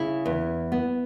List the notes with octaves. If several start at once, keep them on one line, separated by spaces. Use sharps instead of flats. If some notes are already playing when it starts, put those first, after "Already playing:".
Already playing: C#3 E4
E2
B3